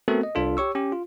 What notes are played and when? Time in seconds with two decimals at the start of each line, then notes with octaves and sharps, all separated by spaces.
0.08 A3 B3 C4 F#4 A4 A#4
0.23 D#5
0.35 C2 D4 F4 A4
0.57 G4 C#5 C#6 E6
0.75 C#4 G4
0.92 F4